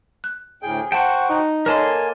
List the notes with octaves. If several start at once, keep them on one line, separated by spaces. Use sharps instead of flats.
F#6
D2 A2 G#4 G5
F#4 C5 F#5 G5 A5
D#4
A#3 A4 A#4 C#5 D#5 G#5 A5 C6